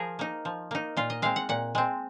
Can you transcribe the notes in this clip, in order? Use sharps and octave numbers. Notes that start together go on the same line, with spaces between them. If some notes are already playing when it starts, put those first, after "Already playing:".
Already playing: F3 G#4 A#4
A#3 D#4
F3
A#3 D#4
A#2 F4
D#5
G#3 C4 F5
F#5
A#2 F#5
G#3 C4